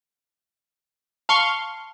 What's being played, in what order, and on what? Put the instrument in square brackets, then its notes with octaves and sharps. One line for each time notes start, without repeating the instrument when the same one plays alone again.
[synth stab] F5 C6 C#6 [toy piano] A5